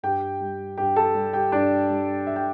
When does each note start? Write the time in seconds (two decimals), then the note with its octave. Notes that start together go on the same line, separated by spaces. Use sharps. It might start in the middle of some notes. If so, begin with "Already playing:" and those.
0.03 G2 G4 G5
0.40 G3
0.77 G2 G4 G5
0.96 A4 A5
1.15 G3
1.33 G4 G5
1.52 G2 D4 D5
1.90 G3
2.27 G2 E5
2.36 G5